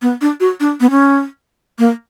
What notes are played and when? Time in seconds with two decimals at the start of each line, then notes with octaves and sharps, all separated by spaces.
0.02 B3
0.21 D4
0.40 F#4
0.60 D4
0.81 B3
0.90 C#4
1.79 A#3